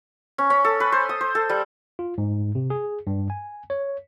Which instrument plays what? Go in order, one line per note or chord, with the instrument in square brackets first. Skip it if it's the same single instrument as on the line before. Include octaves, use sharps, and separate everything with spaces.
[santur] C#4
C#4
A4
B4
C5
D#6
C5
A4
G3
[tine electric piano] F4
G#2
C3
G#4
G2
G#5
C#5